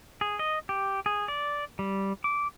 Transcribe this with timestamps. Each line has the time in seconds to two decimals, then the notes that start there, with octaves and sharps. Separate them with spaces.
0.21 G#4
0.39 D#5
0.69 G4
1.06 G#4
1.28 D5
1.79 G3
2.24 D6